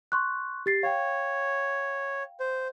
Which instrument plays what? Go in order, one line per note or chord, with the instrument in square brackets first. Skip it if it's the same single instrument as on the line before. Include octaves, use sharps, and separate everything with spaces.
[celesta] C6 C#6 F#6
G4 A6 C7
[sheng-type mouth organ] C#5 [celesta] F5 G5
[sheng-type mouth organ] C5